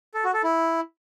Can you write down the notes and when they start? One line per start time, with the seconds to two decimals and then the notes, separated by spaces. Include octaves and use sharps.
0.14 A4
0.24 F#4
0.34 A4
0.44 E4